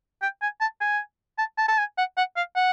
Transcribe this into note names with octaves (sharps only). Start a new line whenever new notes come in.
G5
G#5
A5
G#5
A5
A5
A5
G#5
F#5
F#5
F5
F#5